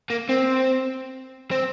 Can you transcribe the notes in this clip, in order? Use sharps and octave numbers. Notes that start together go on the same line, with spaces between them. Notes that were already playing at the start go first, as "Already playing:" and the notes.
A#3
C4
C4